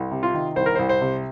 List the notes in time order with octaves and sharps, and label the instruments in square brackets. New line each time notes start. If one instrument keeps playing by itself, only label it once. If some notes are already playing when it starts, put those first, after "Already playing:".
Already playing: [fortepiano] C2
C3
F4
D#3
C2 C5
A#4
C2 C5
C5
C3